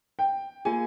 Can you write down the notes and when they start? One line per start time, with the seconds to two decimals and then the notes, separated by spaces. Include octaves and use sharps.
0.19 G5
0.65 A#3 F4 G#4 G#5